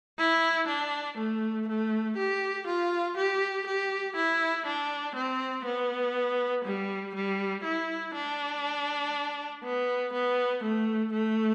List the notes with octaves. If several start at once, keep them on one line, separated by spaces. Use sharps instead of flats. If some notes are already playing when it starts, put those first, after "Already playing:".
E4
D4
A3
A3
G4
F4
G4
G4
E4
D4
C4
B3
G3
G3
E4
D4
B3
B3
A3
A3